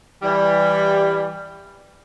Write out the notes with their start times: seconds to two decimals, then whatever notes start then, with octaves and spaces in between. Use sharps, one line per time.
0.22 E3 G3